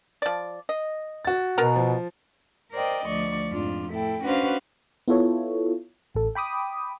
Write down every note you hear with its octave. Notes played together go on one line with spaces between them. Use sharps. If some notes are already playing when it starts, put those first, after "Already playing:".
F3 D5
D#5
F#4 A6
B2 B3 A#4 A#5
F3
A#4 C5 D5 D#5 G5
D2 F3 D5 C#6
F2 G#2 D4 F4
A2 E4 A4 G5
C#4 D4 F#4 B4 C5 F5
B3 E4 F4 A4 C#5
A1 A4
G5 B5 D6 D#6